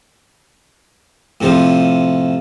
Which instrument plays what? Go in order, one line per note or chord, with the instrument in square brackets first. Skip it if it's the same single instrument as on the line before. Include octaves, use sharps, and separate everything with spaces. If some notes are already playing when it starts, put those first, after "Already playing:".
[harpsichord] A2 C3 F3